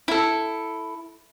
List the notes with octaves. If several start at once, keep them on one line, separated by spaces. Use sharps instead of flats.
E4 A4